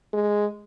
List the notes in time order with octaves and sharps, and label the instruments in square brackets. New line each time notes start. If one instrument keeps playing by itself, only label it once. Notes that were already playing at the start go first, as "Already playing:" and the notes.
[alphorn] G#3